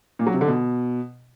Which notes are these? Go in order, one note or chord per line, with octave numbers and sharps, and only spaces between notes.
A#2
F#3
C3
D3
B2